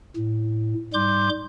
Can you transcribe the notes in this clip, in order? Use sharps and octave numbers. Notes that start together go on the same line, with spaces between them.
A2
G#2 G3 C6 D6 G6